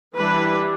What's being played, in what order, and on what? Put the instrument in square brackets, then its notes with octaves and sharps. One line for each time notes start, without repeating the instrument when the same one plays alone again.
[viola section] E3 G3 D4 B4